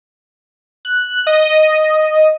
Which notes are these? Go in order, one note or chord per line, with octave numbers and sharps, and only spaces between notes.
F#6
D#5